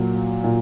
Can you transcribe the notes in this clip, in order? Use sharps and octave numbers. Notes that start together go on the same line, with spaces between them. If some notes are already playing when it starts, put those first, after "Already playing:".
Already playing: A#2 F#3
A#2